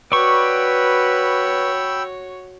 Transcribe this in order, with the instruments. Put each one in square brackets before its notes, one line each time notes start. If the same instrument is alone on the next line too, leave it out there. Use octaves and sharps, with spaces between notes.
[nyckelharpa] F#4 C#5 [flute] B4 [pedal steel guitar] D5 C#6 [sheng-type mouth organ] G5 B5 E6